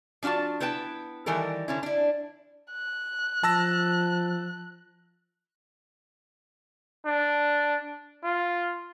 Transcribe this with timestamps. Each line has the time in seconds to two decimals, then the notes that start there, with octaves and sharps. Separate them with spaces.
0.23 F3 D4 F4 F#4 A5
0.60 B3 E4 B4 G5 A5
1.26 D#3 E3 G3 A4 A#4
1.68 D3 C#4 E4
1.83 D4 E4
2.72 F#6
3.43 F3 A5 E6 A#6
7.06 D4
8.23 F4